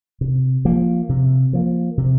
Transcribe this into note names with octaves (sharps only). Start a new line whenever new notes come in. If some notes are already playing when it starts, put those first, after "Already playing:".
C3
F3 A#3
C3
F3 A#3
C3